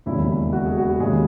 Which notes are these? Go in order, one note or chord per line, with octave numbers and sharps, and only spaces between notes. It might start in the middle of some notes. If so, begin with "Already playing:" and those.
E1 D#2 C#3 F#3 E4
F#4
G#4
F#4
D#2 C#3 G#3 G#4